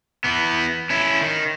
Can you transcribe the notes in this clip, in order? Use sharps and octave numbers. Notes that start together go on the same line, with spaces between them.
E3 B3
C#4 E4
D#3